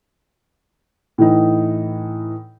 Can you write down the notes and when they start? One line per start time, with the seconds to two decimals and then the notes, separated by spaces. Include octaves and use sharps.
1.18 A2 E3 D#4